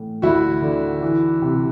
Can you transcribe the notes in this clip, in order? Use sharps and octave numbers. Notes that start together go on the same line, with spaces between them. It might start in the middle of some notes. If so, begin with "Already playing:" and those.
Already playing: A2 E3
D2 E4 F#4
D3
E3
C3